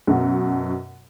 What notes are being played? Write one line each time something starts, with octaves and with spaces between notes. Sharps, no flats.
F#2 B2 F#4